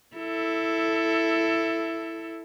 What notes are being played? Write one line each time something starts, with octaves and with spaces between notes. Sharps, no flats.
E4 A4